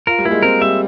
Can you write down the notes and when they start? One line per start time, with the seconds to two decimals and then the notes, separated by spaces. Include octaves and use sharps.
0.07 F4 A#4
0.18 G3
0.25 A#3 E4
0.31 G#3
0.43 C4 A#4
0.61 G3 E5